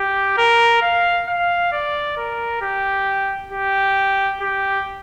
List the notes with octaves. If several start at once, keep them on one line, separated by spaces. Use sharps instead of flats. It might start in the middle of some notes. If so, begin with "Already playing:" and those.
Already playing: G4
A#4
F5
F5
D5
A#4
G4
G4
G4